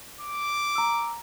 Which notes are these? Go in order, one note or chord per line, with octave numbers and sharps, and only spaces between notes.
D6
A#5 E6